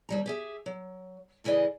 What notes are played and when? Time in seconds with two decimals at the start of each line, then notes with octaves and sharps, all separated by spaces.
0.09 D#2 G3 A#5
0.26 G4 G#4 E5
0.66 F#3
1.44 A2 C#3 E3 G#4 D5 D#5